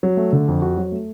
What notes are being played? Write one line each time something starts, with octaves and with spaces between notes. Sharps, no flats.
F#3
A3
D3
F2
F#4
F#3
A3